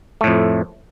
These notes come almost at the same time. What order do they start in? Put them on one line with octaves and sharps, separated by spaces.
A3 A2 F2